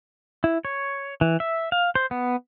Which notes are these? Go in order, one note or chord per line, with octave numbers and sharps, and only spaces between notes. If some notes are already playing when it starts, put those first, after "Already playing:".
E4
C#5
E3
E5
F5
C5
B3